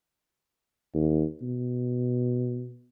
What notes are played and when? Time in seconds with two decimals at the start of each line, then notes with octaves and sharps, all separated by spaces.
0.94 D#2
1.42 B2